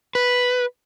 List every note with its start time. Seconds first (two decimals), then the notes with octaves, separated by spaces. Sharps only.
0.15 B4